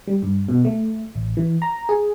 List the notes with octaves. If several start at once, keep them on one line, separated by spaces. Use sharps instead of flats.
G3
G2
B2
A3
A1
E3
A#5
G#4